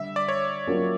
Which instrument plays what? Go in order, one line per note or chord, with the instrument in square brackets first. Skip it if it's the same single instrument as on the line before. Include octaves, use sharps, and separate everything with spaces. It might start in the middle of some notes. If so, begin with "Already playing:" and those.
Already playing: [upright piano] D3 G3 [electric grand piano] E5
[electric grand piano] D5
C#5
[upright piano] F#3 A#3 C#4 F4 A#4